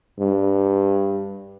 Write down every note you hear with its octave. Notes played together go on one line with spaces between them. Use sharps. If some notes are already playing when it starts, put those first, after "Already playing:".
G2